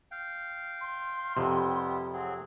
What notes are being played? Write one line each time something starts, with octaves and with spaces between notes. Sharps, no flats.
F5 G5
C6
F2 C3 G3 B3 E4
F#3 C4 G#4